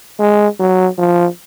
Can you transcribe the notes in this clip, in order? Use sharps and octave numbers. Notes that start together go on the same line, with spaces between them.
G#3
F#3
F3